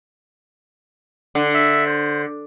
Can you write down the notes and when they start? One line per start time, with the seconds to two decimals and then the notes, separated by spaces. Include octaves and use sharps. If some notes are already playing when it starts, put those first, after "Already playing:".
1.35 D3
1.54 E5
1.86 C5